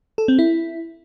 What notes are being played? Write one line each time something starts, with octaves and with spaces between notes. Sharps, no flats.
A4
C4
E4